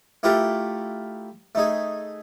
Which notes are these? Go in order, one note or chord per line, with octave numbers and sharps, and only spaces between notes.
A3 E4 F4 G4 A4 A#4
A3 D#4 G#4